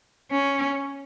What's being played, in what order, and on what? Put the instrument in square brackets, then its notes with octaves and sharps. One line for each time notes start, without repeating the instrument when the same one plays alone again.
[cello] C#4